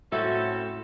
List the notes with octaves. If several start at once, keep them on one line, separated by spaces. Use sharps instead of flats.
A2 C4 C#4 E4 F#4 A4